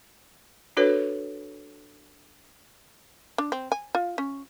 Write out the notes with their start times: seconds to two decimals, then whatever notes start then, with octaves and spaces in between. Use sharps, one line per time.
0.77 D4 F#4 A4 B4 C#5
3.38 D4
3.52 C4
3.72 G#5
3.95 F4
4.18 C#4